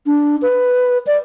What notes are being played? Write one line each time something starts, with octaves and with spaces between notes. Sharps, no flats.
D4
B4
D5